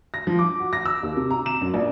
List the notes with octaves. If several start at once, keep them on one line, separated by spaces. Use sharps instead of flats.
A#6
F3
D6
F#4
A#6
E6
D#2
C3
A#5
E7
F#2
A#1